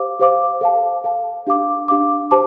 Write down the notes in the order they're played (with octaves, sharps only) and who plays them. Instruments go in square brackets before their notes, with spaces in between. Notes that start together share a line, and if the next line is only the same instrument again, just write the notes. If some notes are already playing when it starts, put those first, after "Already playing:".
Already playing: [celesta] G4 C5 F5 D6
G4 C5 F5 D6
A4 F5 A5
A4 F5 A5
D4 G4 F5 D6
D4 G4 F5 D6
G4 C5 A5 D6